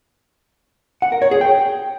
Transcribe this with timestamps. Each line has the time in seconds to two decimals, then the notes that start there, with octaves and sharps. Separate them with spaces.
1.02 F#5
1.12 A#4
1.22 C#5
1.31 G#4
1.41 G5